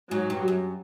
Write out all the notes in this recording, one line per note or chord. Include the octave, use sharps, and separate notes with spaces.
G#2 F#3
G2
F#2